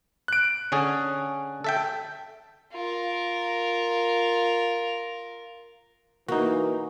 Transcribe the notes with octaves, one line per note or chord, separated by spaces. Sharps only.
F#6 D7
D3 C#4 G#4
A4 E5 G5
F4 A#4
E3 A#3 D#4 F#4